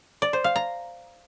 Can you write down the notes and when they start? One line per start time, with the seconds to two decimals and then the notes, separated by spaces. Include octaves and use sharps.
0.22 D5
0.33 C5
0.44 F5
0.56 A#5